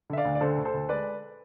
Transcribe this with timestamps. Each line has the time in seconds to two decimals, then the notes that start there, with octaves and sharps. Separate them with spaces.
0.10 D3 E5
0.17 D5 F5
0.25 D2
0.35 D5
0.41 D3 A4 C5
0.58 D2
0.65 A4 C5
0.74 D2
0.89 G#3 B4 D5